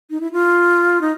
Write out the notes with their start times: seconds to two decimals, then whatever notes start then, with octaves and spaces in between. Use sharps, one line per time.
0.10 D#4
0.21 E4
0.32 F4
1.01 D#4